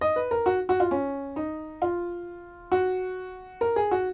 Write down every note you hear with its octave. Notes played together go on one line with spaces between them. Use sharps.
D#5
B4
A#4
F#4
F#4
F4
C#4
D#4
F4
F#4
A#4
G#4
F#4